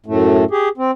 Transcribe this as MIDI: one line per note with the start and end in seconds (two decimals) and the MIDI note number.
0.06 0.44 42
0.06 0.44 45
0.06 0.44 57
0.51 0.69 67
0.51 0.69 68
0.77 0.91 60